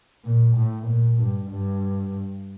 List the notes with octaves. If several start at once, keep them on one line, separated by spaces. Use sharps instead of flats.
A#2
A2
A#2
G2
G2